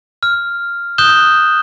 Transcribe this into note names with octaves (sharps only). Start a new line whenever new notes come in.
F6
D#6 F#6 G6 E7 G7